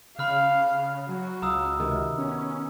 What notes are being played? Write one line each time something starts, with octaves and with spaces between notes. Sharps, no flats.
C#3 F5 B5 F6 F#6
F#3 F#4
C#2 F5 A#5 D#6 E6
C3 D#3
B3 C#4